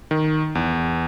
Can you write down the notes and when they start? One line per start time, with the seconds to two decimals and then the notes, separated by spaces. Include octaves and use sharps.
0.11 D#3
0.55 E2